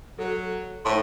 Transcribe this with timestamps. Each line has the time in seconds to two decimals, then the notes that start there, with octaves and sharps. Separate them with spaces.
0.18 F#3 A4
0.85 A2 D#4 C5 C6